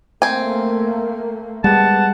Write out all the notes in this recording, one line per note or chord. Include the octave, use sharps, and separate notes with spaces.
A3 A#3 C4 G#5
G3 G#3 B3 F#5 A5